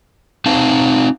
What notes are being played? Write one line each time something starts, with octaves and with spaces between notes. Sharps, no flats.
C4 D#4 F5 A5